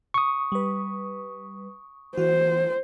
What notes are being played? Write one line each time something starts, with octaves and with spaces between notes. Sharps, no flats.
C#6 D#6
G3 B4
E3 F#4 C5